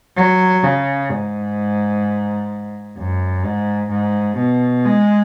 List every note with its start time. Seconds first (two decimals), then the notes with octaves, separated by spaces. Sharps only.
0.16 F#3
0.63 C#3
1.10 G#2
2.97 F#2
3.44 G#2
3.90 G#2
4.37 B2
4.85 G#3